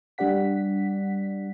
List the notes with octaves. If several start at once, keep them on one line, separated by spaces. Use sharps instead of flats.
G3 D4 G4 D5 F#5 B6